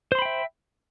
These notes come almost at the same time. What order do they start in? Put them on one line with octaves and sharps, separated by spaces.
C5 C6 B5 G5 E5